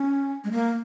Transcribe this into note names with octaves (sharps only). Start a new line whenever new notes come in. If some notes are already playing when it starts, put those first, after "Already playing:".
Already playing: C#4
G#3
A#3